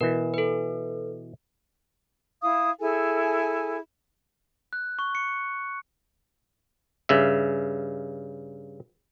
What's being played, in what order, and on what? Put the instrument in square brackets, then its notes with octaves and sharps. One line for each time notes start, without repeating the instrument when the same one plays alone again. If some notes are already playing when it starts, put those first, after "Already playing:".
[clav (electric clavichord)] B2 E3 [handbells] A#4
[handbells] A4 B4
[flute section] E4 F5 D#6
E4 G#4 A4 G#5
[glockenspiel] F#6
C#6
C#7
[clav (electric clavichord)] G2 C#3 E5